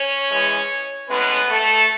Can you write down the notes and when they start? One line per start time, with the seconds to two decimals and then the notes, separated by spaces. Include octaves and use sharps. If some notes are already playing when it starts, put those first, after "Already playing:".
Already playing: C#4 C#5
0.29 E3 G#3 C#4
1.08 A2 G#3 B3 C#4 B4
1.48 A3 A4